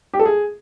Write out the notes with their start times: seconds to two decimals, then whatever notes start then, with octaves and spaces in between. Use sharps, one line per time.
0.13 G4
0.19 A4
0.25 G#4